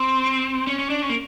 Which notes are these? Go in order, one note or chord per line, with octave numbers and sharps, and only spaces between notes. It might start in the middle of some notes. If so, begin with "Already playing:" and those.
Already playing: C4
C#4
C#4
D4
C#4
A#3